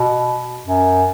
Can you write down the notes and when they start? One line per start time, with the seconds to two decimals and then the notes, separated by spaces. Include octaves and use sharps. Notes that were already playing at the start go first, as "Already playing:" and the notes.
Already playing: B2
0.66 F#2